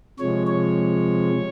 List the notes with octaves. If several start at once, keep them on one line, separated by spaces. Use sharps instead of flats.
C3 F3 G#3 C#5
C#5